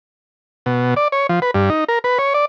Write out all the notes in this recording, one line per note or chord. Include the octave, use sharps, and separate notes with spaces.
B2
D5
C#5
F3
B4
G2
D#4
A#4
B4
C#5
D5